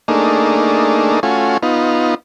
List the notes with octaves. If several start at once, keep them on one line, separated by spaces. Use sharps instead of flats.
A3 A#3 D4 D#4 G#4
A3 C#4 F4 F#4 G#5
B3 D#4 F4